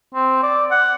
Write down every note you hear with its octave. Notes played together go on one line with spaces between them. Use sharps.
C4
D5
F#5